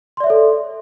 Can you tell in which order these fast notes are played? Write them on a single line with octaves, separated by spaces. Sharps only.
C6 D5 E5 C#5 A4